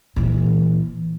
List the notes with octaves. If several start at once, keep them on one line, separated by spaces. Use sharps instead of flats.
A#2 E3